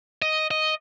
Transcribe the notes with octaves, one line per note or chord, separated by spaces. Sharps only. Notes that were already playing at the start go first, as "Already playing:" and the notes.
D#5
D#5